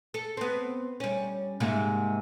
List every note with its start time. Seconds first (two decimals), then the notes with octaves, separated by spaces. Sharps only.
0.14 A4
0.37 B3 C4
1.00 G3 C#4
1.60 G#2 C3 A#3